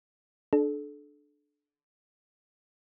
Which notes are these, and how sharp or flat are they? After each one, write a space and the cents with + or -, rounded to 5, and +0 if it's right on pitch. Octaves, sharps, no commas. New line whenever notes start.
D4 +10 A4 -30